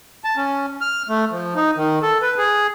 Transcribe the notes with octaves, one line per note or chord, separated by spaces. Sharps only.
A5
C#4
F6
A3
F3
D#4
D#3
A4
B4
G#4